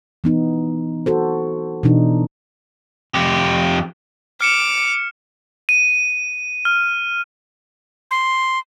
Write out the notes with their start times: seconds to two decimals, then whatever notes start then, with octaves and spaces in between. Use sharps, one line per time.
0.24 E3 B3 D#4
1.06 F#4 A4 C5
1.83 B2 E3 D4 D#4
3.14 F2 G4
4.41 D6 F6 C#7 E7 F7
5.69 D#7
6.65 F6
8.11 C6